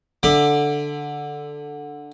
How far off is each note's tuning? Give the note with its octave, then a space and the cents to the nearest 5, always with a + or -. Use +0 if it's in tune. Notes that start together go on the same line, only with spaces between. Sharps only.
D3 +0 E5 +0 D6 +20